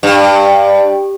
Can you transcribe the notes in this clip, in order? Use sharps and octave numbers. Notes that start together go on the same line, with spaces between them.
G2